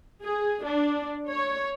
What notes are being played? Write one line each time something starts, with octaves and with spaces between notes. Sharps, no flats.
G#4
D4
C#5